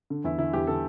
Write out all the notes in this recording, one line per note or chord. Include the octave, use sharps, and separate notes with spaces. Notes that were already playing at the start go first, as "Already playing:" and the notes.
D3
E2 E4
D3 E4
E2 G4
D3 A4